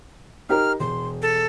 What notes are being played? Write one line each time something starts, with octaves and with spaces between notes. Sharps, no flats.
D#4 G4 A#4 F6
E1 C6
A4